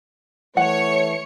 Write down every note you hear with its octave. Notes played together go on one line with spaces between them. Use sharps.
E3 A3 C#5 F#5 C#7